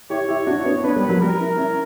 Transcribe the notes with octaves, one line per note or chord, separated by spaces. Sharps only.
E4 G4 C#5
E4 G4
D4 F#4
E4
B3 D4
B3 D4 B4
G3 B3
F#3 A#3
G3 A#4
C#4 E4
C#4 E4